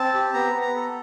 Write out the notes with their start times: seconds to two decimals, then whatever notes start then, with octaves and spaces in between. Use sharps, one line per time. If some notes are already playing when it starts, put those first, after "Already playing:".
Already playing: C4 A5
0.14 G4
0.34 B3 A#5
0.55 B3
0.62 A#5
0.76 A4